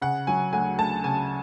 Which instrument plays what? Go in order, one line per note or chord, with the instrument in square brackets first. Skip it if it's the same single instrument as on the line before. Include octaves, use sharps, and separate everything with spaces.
[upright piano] C#3 F#5
F#3 G#5
D2 G#5
D2 A5
C#3 G#5